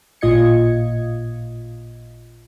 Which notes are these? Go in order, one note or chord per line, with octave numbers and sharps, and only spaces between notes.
A1 A#2 F4 D#5 G#6 C#7